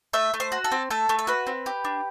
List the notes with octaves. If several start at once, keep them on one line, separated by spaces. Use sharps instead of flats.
A3 E5
A3
C5
F#4
A4
C4
A3 A4
A3
A4
F#4 B4
C4
G4
D4